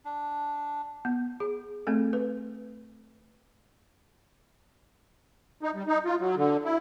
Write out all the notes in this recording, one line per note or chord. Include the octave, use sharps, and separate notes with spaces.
D4
B3
G#4
A3 C4 A4
B4
D#4
G3
D#4
F4
F#3
D3
E4